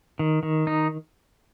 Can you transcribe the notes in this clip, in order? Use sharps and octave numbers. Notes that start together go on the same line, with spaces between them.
D#3
D#3
D#4